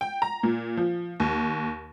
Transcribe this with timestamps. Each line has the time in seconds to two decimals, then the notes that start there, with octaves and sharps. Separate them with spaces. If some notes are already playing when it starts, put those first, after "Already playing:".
0.01 G5
0.22 A#5
0.43 A#2
0.77 F3
1.20 D#2